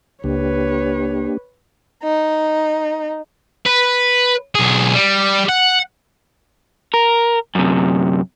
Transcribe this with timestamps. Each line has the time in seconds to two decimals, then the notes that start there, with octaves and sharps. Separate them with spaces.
0.24 C#2 A#3 D4 G4 B4 C#5
2.03 D#4
3.66 B4
4.55 B1 G#4
4.94 G3
5.49 F#5
6.94 A#4
7.55 F#2 C3